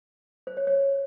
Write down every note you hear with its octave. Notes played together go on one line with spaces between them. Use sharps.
C5
C#5
C#5